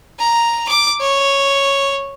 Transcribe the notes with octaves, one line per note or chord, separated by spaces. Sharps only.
A#5
D6
C#5